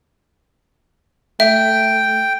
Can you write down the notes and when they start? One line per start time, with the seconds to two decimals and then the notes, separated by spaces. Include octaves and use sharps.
1.40 A3 E5 G5